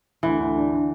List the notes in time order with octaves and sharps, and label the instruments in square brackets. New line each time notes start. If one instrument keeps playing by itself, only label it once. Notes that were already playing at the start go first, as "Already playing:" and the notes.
[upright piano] D2 [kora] E3
[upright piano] D2
D4
D3